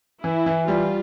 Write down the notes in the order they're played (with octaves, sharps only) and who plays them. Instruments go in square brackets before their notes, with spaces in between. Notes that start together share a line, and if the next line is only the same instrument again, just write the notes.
[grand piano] E3 [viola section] E4
[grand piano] E3
[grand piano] G3 [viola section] F4